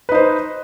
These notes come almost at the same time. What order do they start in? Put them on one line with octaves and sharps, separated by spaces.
B4 D#4 C5